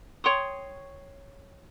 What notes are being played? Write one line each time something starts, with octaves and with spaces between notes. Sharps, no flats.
C#5 G5 C6 D#6